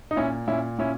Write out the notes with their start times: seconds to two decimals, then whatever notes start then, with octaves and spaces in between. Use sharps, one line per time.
0.11 D#4
0.16 A#2 C#4 E4
0.48 A#2 C#4 E4
0.79 A#2 C#4 E4